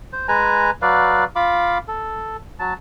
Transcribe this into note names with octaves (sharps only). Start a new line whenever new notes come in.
C5
G#3 B4 G#5 A#5
F#3 B4 D5 F5
F4 F5 B5 D6
A4
F#3 A5